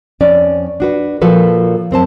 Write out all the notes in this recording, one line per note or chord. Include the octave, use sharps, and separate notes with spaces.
F2 C#4 D5
D4 F#4 B4
A#2 F3 F#4 A4 B4
F#2 C4 C5 A5